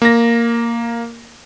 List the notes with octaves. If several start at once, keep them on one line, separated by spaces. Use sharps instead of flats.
A#3 A#6